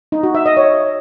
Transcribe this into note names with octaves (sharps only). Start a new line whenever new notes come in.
D#4
F#4
E5
D#5
C#5